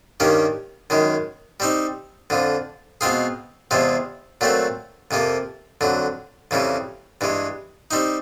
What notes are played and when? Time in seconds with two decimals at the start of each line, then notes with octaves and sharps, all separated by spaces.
0.20 G2 D#3 G3 A#3 C#4
0.90 F#2 D#3 G#3
1.60 G3 C4 D#4
2.30 F2 D3 F3
3.01 B2 G#3 C4 F4 G#4
3.71 E2 C3 F3 G#3 C4
4.41 A#2 F#3 A3 C4
5.11 F2 C3 F3 A#3
5.81 F2 D3 F#3
6.51 F2 C#3 E3 G3
7.21 G2 E3 G#3
7.91 G3 C4 D#4